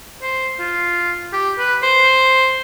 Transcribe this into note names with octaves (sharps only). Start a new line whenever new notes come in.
C5
F4
G4
B4
C5